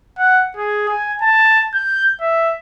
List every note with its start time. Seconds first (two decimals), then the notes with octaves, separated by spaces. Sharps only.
0.18 F#5
0.57 G#4
0.88 G#5
1.22 A5
1.74 G6
2.21 E5